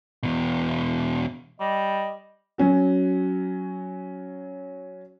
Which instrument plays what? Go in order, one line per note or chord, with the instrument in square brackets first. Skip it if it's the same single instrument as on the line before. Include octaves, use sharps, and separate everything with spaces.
[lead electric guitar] E2 B2
[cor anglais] G3 [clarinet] D#5
[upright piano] F#3 C#4 F#4